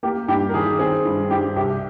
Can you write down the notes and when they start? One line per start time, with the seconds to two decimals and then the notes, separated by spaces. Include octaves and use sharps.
0.03 A#3 G4
0.28 G2 G4
0.49 A#4
0.54 D#3 G#4
0.79 C4 G#4
1.05 G2
1.31 G2 G4
1.56 C2 G4